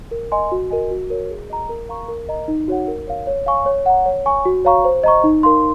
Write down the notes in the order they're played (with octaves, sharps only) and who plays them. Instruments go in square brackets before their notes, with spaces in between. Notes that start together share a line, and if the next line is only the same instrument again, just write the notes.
[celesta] A#4
D#5 G#5 C6
F#4
A#4 D#5 G#5
F#4
A#4 C#5
G#4
D#5 A#5
A#4
F5 A#5 C#6
A#4
D#5 A#5
D#4
F#4 C#5 F#5
A#4
C#5 F5
C#5
F5 G#5 C#6
C#5
F#5 A#5
C#5
G#5 C#6
F#4
C#5 F5 A#5 C#6
C5
D#5 A#5 C#6
D#4
A#4 F5 C6